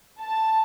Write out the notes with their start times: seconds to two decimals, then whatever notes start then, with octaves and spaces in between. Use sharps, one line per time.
0.22 A5